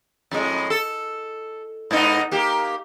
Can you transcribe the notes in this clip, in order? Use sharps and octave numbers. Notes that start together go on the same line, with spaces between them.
F2 A2 G#3
A4
G#2 B3 D#4
A#3 G4